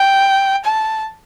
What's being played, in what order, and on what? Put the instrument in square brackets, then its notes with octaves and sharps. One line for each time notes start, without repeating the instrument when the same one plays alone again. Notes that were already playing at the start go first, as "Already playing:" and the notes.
Already playing: [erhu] G5
A5